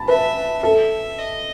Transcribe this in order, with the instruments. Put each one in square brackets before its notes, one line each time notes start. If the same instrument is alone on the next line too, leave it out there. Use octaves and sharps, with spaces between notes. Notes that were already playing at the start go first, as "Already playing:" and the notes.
Already playing: [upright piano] A5 B5
[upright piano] B4 [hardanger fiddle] E5
[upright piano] A4 [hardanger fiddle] E5
[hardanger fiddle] D#5